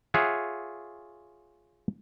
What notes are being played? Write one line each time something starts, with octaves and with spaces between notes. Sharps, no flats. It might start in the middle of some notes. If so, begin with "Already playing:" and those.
F4 G#4 C#5 E5 F#5